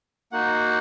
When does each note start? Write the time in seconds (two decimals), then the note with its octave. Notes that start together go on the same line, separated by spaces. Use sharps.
0.32 A#3 D#4 F#4 F#5